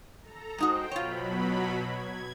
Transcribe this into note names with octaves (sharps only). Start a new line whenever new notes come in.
A4 A#5
G#3 D#4 F#4 C5 G5
B2 F#3 F4 C#5 B5
G#6